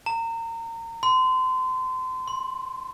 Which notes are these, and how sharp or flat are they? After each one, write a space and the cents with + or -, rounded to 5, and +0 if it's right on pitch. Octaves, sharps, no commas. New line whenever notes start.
A#5 -30
C6 -30
C6 +15